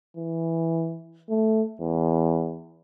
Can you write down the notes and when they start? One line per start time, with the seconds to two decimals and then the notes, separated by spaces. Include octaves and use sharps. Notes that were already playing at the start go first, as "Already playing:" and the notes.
0.17 E3
1.30 A3
1.81 E2